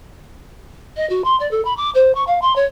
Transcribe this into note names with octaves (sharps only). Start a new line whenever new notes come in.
D#5
F#4
C6
D5
A4
B5
D6
C5
C#6
F5
C6
C#5